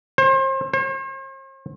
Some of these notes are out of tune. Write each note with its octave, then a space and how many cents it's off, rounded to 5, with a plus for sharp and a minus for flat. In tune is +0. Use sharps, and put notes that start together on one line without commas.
C5 +35
C5 +45